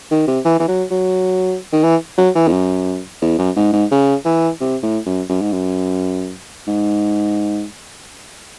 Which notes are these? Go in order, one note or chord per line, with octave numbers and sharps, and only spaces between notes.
D#3
C3
E3
E3
F#3
F#3
D#3
E3
F#3
E3
E2
F#2
E2
F#2
G#2
G#2
C#3
E3
C3
A2
F#2
F#2
G#2
F#2
G#2